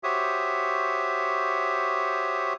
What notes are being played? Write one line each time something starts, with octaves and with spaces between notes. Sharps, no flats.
F#4 G4 C5 C#5 E5 D#6